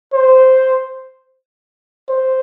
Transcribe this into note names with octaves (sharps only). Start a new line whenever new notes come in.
C5
C5